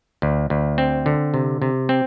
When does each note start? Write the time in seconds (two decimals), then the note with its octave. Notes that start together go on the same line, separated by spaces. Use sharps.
0.22 D2
0.50 D2
0.78 C4
1.06 D3
1.34 C3
1.62 C3
1.89 C4